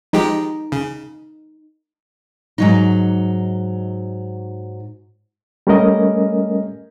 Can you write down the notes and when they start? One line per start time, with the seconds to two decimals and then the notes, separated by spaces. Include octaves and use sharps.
0.13 F3 G#3 D#4 G4
0.72 C#3
2.58 G#2 F#3 D#4
5.67 G3 A3 C#4 A#4 D#5